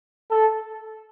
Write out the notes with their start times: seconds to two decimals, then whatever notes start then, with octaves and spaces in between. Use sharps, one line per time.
0.30 A4